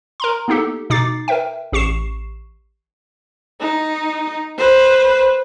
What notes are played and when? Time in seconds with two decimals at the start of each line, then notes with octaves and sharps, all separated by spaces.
0.20 A#4 A#5 C6
0.48 A#3 B3 D#4 G4 A4
0.90 B2 D#4 D6 A6 C7
1.28 A#4 B4 E5 G5
1.72 A1 G4 C#6 C7 E7
3.60 D#4
4.58 B4 C5